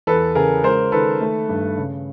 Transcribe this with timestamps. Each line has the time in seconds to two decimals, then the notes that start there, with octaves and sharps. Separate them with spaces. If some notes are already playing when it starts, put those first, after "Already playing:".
0.07 E2 A4 B4
0.35 C#3 G#4 A#4
0.64 G#3 A#4 C5
0.92 D#3 A4 B4
1.21 A3
1.49 G2
1.77 C#3